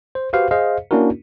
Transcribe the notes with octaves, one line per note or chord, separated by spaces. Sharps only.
C5
F#4 G4 B4 C5 F5
G#4 C5 D#5 F5
A#3 C#4 D4 E4 F#4 A#4